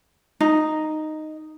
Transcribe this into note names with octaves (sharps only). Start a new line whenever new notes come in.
D#4